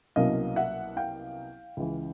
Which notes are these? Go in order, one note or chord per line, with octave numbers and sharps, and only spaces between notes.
C2 B2 F#3 A#3 C#4 D#5 F5
E5 F#5
F5 G5
C#2 C#3 E3